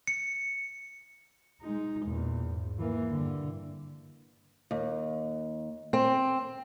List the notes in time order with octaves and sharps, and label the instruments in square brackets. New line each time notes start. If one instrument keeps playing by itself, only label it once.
[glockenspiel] C#7
[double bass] G#3 D#4
E2 A#2
G#2
E3 A#3
G2 D3
[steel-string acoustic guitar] D#2
C4